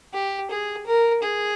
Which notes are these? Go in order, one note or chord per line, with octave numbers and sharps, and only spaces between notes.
G4
G#4
A#4
G#4